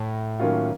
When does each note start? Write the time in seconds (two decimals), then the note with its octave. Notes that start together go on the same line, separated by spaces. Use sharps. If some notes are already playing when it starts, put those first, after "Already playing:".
Already playing: A2
0.40 D#3 F#3 A#3 C#4 F4